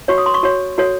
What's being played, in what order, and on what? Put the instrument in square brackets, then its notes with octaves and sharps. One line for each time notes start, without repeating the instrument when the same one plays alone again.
[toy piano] F#4 C#5 C#6
D#6
C6
C#6
F#4 C#5
F#4 A4 C#5